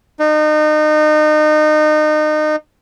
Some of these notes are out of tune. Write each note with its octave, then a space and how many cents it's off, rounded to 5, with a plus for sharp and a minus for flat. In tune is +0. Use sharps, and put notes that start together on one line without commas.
D#4 -30